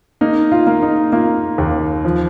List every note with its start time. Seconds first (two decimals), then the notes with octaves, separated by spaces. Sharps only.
0.21 A#3 D#4
0.52 F4
0.67 A#3
0.82 D#4
1.12 A#3 F4
1.58 D#2
2.05 F3